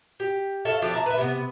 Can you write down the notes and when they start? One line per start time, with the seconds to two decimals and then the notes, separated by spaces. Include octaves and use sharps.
0.20 G4
0.65 A4 C#5 E5 F5
0.82 F3 D4 G4 A4
0.93 E5 A5 A#5
1.06 B4 E5
1.18 C3 B3